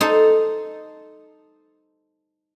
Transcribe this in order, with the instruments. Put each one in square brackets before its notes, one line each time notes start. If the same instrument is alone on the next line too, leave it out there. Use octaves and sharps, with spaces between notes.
[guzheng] D#4 A4 C5